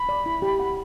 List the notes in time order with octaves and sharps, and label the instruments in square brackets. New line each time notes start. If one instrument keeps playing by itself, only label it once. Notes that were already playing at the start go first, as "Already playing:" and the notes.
Already playing: [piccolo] B5
[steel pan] D5
E4
G4
F#5